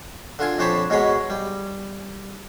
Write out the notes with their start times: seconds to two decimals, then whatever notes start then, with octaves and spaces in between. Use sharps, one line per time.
0.39 D3 D4 F4 G#5
0.58 F2 D4 C5 C#5 A5 B5
0.90 G#2 B2 G#3 G#4 C#5 B5
1.30 G3